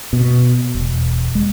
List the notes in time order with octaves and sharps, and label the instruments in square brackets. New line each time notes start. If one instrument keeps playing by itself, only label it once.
[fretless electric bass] B2
E1
G#3